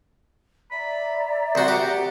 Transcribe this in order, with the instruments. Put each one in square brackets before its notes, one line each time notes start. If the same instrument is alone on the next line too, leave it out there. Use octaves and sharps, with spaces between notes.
[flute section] D5 E5 A#5 [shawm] B5
[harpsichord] C2 F#4 [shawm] C5
[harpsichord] G4 [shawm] F#5